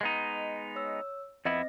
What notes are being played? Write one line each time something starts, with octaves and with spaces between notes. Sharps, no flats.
G#3 B3 D#4
C#5 E6
F2 B3 C4 E4 D#5 A#6